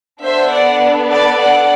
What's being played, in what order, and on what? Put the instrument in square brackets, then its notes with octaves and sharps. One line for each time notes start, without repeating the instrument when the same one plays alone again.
[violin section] B3 D4 A4 C5 E5
D5 F#5
B4 D5
D5 F#5